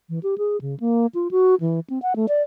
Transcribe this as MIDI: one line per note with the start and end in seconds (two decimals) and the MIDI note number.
0.09 0.19 52
0.23 0.35 67
0.38 0.60 68
0.61 0.78 49
0.80 1.06 58
1.15 1.28 65
1.31 1.55 66
1.60 1.80 52
1.90 1.99 60
2.02 2.13 78
2.16 2.26 57
2.28 2.42 74